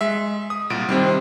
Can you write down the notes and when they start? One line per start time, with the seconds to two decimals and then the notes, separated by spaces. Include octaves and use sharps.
0.01 G#3 E5
0.50 D#6
0.70 C2 A#2 D7
0.89 C3 D#3 G3 C4